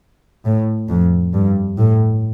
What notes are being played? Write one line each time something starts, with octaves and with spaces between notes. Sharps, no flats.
A2
F2
G2
A2